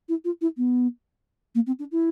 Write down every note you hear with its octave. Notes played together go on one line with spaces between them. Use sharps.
E4
F4
E4
B3
A#3
C4
D4
E4